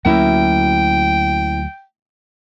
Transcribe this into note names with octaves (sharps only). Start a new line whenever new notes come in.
D2 F#3 A#3 C#4 E4 G5